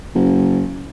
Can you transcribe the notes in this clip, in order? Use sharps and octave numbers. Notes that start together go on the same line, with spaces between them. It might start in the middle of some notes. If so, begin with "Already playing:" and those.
F#1